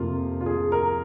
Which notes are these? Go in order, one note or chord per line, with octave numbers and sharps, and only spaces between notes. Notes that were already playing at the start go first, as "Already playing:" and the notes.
Already playing: F2 C3 F3 A#3 F4
F4
G#4
A#4